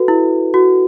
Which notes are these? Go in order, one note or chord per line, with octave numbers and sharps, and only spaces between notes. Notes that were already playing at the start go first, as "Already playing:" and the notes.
Already playing: F#4 A4 B4
E4
F#4